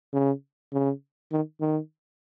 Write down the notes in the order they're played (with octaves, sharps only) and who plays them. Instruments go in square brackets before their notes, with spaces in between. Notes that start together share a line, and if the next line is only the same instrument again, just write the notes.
[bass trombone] C#3
C#3
D#3
D#3